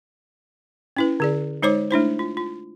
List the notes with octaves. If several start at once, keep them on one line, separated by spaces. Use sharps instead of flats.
C#4 E4 B4
D3 G#4 D5
G#3 D#4 C5 C#5 D6
A3 D4 E4 C5
F4
F4